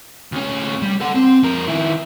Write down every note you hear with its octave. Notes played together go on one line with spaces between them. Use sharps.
D2 C#4
G3
A4 F#5
C4
F2 A#4
D#3 E4